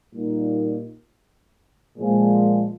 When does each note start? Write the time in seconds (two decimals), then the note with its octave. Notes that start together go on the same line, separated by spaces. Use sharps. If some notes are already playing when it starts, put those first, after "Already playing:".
0.13 A#2 G3 A#3 D#4
1.98 A#2 F3 G#3